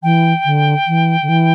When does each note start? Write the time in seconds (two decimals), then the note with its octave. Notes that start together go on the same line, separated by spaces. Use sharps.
0.03 E3 G5
0.45 D3
0.87 E3
1.22 D3
1.28 E3